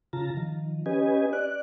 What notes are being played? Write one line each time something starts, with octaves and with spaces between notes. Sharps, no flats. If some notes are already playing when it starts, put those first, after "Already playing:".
C#3 F4 A5 A#5
D#3 F3
C#4 G4 B4 D#5 G#5
D5 F#6